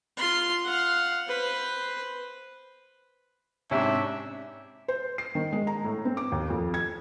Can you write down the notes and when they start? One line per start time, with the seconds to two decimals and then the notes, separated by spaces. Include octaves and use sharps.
0.16 F4 C6
0.64 F5 F#5
1.27 B4 C5
3.71 G#2 C3 C#4 D4 E5
4.88 C5
5.18 C7
5.35 D#3
5.53 G#3
5.67 A#5
5.84 A2
6.05 C4
6.17 D6
6.32 D#2
6.50 F2
6.74 G#6